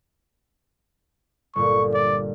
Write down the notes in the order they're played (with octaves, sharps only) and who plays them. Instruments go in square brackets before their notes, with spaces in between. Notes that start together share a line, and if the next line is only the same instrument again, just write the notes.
[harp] G1 A#2 [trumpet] C#6
[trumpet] D5